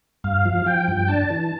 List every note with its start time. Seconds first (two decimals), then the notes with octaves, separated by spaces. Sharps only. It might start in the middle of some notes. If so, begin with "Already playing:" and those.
0.24 G2 F5
0.46 F3
0.66 F3 G5
0.88 G2
1.08 D4 A5
1.30 E3